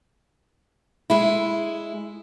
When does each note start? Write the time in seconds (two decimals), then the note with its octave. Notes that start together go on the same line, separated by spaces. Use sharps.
1.10 G#3 E4